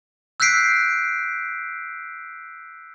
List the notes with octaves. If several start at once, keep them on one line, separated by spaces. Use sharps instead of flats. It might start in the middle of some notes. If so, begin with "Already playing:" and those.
E6 F#6 G6 B6 C7 D7